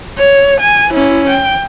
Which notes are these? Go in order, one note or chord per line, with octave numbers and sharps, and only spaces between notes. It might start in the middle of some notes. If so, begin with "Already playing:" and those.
C#5
G#5
C#4 E4
G5